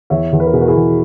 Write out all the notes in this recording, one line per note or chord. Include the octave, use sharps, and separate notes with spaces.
E2 C#5 E5
E2
B4
A#4
B2 G#4
F#4 A#4
E4 G#4
E2